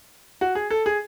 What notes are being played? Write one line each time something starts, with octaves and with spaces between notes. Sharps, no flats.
F#4
G#4
A4
G#4